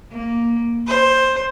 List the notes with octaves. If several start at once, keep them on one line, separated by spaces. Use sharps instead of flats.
A#3
C5